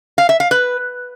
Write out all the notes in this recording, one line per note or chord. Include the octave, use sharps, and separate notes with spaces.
F5
E5
F5
B4